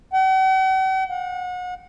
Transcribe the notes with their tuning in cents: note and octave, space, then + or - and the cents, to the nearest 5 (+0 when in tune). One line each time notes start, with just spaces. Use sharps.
F#5 +45
F#5 -35